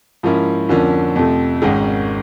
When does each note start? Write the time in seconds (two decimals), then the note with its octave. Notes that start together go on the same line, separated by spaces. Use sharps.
0.23 G#2 F3 A#3 C#4 E4
0.69 F2 D3 F3 A#3 C#4
1.16 F2 C3 F3 A3
1.62 G#1 G#2 D#3 G#3 C#4